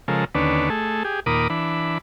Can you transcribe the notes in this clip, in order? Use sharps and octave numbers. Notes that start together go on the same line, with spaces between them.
C#3 F3 G#3 A4 A#4
D#2 D3 C#4 D4 B4
A3 G#4 A4
G4 G#4
D#2 A#2 A#4 B5 D6 D#6
E3 D4 B5